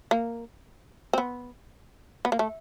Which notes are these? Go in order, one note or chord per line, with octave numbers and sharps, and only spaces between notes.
A#3
C4
B3
B3
A#3
A3